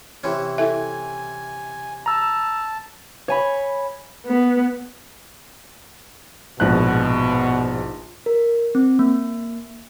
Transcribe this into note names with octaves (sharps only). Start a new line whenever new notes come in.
C3 E3 C#4
E4 A4 E5 G#5
A5 A#5 E6
C#5 G#5 B5
B3
A#1 G#2 B2 F#6
A#4
C4
A#3